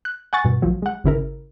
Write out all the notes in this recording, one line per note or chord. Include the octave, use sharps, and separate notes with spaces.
F#6
F#5 G#5 C#6 A6
G2 B2
A#1 F3 F#3
G#3 F#5
G#1 C#3 E4 A#4